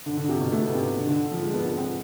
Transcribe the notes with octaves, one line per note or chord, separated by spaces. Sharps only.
D3
D3
C3
B2
A3
B3
C3
B2
D3
D3
F3
G#3
B3
B3
C4